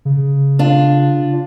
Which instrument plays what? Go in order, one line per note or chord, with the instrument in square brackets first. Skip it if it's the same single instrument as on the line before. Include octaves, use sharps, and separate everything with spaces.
[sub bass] C#3
[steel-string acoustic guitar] D4 F4